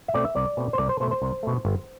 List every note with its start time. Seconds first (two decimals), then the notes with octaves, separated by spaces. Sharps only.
0.08 E5
0.14 B2 A3 C4 D5
0.25 E5
0.35 C2 D5
0.57 B2 A3 C4
0.73 C5
0.78 C2 D5
0.89 C5
1.00 B2 A3 C5
1.11 C5
1.22 C2
1.43 B2 A3
1.65 G1